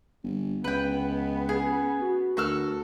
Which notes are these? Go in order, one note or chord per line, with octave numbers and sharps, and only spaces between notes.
G1
C#2 B3 B4 G5
D#5
C#4 G#4
F#4
D2 F#4 A4 A#4 F6